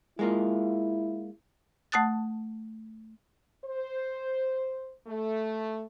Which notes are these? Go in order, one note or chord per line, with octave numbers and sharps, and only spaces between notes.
G#3 A#3 E4 F4
A3 F#5 A5 D#6 F#6 A6
C5
A3